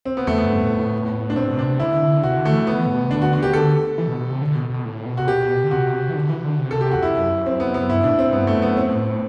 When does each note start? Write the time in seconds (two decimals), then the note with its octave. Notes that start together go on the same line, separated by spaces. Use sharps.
0.05 C4
0.17 B3
0.27 E2 A3
0.38 B3
0.44 F#2
0.49 G2
0.64 A2
0.78 A2
1.30 D4
1.36 B2 C4
1.43 A2
1.51 B2
1.58 C3 D4
1.79 D3 E4
2.02 D3
2.23 C3 F#4
2.37 D3
2.45 A3
2.52 E3
2.67 B3
2.87 A2
2.94 B2
3.02 C3
3.11 D3 D4
3.22 F#4
3.32 D3 F#4
3.43 G4
3.53 D3 A4
3.98 E3
4.08 B2
4.19 B2
4.30 C3
4.42 D3
4.56 B2
4.70 B2
4.85 A2
5.06 B2
5.17 C3 F#4
5.27 B2 G4
5.64 D3
5.71 C3 F#4
6.09 E3
6.16 D3
6.29 E3
6.44 D3
6.59 C3
6.71 A4
6.81 G4
6.91 E2 F#4
7.02 F#2 E4
7.46 C4
7.60 B3
7.74 B3
7.89 G2 E4
8.04 B2 D4
8.11 A2
8.19 C4
8.32 G2 B3
8.47 A3
8.54 F#2
8.62 B3
8.76 A2 C4